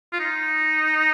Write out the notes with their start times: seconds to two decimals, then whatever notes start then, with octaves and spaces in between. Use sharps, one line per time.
0.13 F4
0.20 D#4